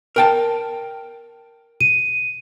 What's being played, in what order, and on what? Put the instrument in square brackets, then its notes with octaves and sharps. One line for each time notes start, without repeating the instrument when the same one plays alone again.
[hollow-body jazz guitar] A#4 G5 A5
[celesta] D#7